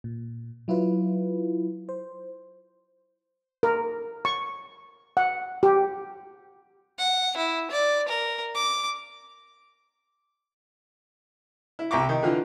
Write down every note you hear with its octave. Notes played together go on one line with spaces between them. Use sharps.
A#2
F#3 E4 F4 B4
C5
A#4
C#6
F#5
G4
F#5
E4
D5
A#4
D6
E4
C2 E5 G5 A#5 C#6 D6
D#3
D3 E3 F4